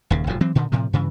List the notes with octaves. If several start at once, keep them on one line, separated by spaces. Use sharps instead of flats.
D#1 D#2 C#3
F1 G#2 F3 F#3
E3 F#3 C4
A#2 D3 D#3
A2 C3 F3
G2 C#3 E3